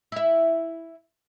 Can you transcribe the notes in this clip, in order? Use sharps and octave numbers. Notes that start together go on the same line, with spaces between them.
E4 E5